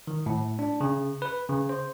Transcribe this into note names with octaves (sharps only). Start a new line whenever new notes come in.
D#3
A2
D4
C#3
B4
C#3
C5